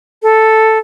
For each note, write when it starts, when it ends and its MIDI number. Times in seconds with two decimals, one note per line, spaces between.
0.23 0.78 69